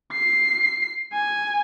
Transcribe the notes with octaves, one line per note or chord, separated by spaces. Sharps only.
C7
G#5